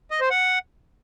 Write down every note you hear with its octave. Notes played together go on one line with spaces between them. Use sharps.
D#5
C5
F#5